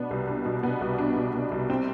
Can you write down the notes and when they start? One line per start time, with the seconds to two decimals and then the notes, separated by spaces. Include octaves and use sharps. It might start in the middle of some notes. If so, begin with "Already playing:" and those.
Already playing: B2 B3 D4
0.11 C2
0.28 D4
0.45 B2
0.63 B3
0.81 C2
0.98 D4
1.16 B2
1.34 B3
1.52 C2
1.70 C4